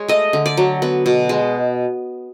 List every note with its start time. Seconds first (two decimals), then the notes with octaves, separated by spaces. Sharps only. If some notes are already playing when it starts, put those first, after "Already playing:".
Already playing: G#3 C#5
0.08 A3 D#5
0.33 D3
0.46 D5
0.57 F#3
0.82 B3
1.06 B2
1.29 G#3